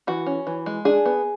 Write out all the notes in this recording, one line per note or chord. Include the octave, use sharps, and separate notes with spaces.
E3 F#4
C#4
E3
G#3
D4 G#4
B3